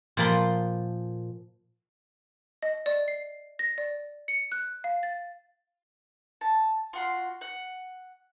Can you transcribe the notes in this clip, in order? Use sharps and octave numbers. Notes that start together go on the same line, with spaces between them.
A#2 F3 A#4 A5 B5 C6
D#5
D5
C7
A#6
D5
C#7
F#6
F5
A6
A5
F4 F#4 C6
F#5